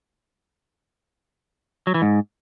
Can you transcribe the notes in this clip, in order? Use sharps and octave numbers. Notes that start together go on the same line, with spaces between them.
F#3
E3
G#2